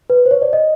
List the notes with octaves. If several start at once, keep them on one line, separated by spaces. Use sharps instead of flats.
B4
C5
C#5
D5
D#5